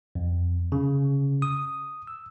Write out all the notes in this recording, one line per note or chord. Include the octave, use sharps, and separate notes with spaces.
F2
C#3
D#6
E6